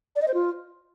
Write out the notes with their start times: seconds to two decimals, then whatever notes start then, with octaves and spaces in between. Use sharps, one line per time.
0.16 D5
0.22 D#5
0.28 C5
0.34 F4